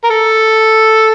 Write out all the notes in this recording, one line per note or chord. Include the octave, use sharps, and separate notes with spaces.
A#4
A4